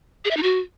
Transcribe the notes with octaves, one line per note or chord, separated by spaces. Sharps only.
G#4
E5
D#4
F#4